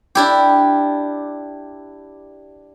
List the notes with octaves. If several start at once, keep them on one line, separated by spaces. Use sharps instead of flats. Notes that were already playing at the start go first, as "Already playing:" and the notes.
D4 E4 G4